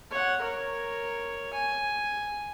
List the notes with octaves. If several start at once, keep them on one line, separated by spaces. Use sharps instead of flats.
C#5 F#5
A#4 C#5
G#5